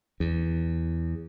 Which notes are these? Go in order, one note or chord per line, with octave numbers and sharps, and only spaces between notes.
E2